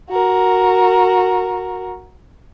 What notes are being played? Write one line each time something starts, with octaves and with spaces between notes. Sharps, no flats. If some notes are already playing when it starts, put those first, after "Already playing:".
F#4 A#4